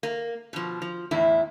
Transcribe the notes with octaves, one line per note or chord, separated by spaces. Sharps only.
A#3
B2 F3
F3
E2 A2 E4